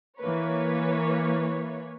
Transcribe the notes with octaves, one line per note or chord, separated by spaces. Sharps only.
E3 A#3 B4 C#5